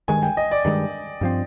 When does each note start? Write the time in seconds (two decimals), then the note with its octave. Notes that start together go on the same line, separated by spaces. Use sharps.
0.08 G2 D#3 G#3 G#5
0.23 G5
0.37 D#5
0.51 D5
0.65 G2 D#3 G#3
1.21 G2 F3 C4